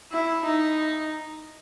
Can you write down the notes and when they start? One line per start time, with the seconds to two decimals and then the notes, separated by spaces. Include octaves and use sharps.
0.12 E4
0.45 D#4